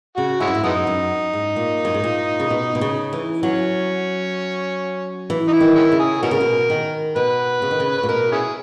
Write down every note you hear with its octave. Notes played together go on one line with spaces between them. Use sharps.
C#3 F#4
G#2 G#3 C#4 E4
F#2
G#2
F#2 G#3 B3 D#4
F#2
G#2
A#2
F#2
G#2
A#2
C#3
B2
B2
C#3
E3
F#3 C#4
E3
D#4
E4
D#3
G#3 C#4 E4
C#3
G#4
B2 C#4 F#4 A#4
C#3
B2
D#3
B2 B4
C#3
D#3
C#3
B4
A#2
B2 A#4
C#4 E4 G#4